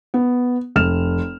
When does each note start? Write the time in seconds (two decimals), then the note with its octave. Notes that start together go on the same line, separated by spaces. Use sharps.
0.14 B3
0.76 F1 F6 E7